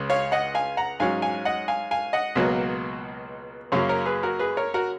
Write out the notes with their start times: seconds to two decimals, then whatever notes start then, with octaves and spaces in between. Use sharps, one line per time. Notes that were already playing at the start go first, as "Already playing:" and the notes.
Already playing: C#2 C#3 C#4
0.10 C#5 F5
0.32 D#5 F#5
0.55 F5 G#5
0.77 F#5 A#5
1.00 G#2 F#3 C#4 F5 G#5
1.22 F5 G#5
1.45 D#5 F#5
1.68 F5 G#5
1.91 F5 G#5
2.13 D#5 F#5
2.35 C#2 B2 F#3 A#3
3.72 F#2 C#3 F#3 A#3 C#5 F5
3.89 A#4 C#5
4.06 G#4 B4
4.23 F#4 A#4
4.39 G#4 B4
4.57 A#4 C#5
4.74 F#4 A#4